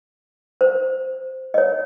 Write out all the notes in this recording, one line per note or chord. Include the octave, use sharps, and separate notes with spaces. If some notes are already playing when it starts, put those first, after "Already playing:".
C5
D#5
C#5